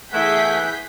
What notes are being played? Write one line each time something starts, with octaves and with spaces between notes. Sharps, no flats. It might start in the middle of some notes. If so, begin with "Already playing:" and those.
E3 A3 B3 E4 G#4 F#5 G6 B6